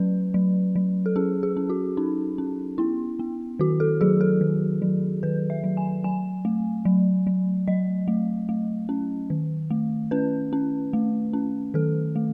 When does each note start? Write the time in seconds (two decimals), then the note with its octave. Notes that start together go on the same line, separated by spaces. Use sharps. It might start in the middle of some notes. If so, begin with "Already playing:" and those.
Already playing: F#3 C#4 B4
0.34 F#3
0.76 F#3
1.06 A4
1.16 C#4 G#4
1.43 G#4
1.57 C#4
1.70 F#4
1.97 C#4 D#4
2.38 C#4
2.78 B3 E4
3.19 B3
3.59 D#3 F#4
3.80 A4
4.01 F#3 G#4
4.21 A4
4.41 D#3
4.82 F#3
5.23 D#3 B4
5.50 E5
5.64 F#3
5.77 G#5
6.04 F#3 G#5
6.45 A3
6.85 F#3
7.27 F#3
7.68 F#3 D#5
8.08 A3
8.49 A3
8.89 C#4
9.30 D#3
9.71 A3
10.11 C#4 B4
10.53 C#4
10.93 A3
11.33 C#4
11.74 D#3 A4
12.16 A3